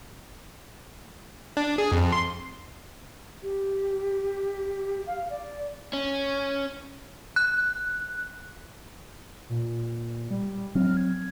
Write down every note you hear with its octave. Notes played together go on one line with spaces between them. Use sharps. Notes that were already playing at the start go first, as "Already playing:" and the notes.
D4
G#4
F2
C6
G4
F5
D5
C#4
F#6
A#2
G3
F#3 C4 F6
G#6